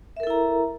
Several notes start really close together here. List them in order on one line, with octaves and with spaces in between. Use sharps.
E5 A#4 A4 E4 A#5